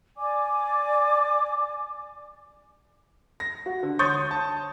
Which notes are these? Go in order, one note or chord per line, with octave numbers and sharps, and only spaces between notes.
D5 G#5 D6
A#6
F#4
D3
C#5 C6 C#6 D#6 G6 A6
A5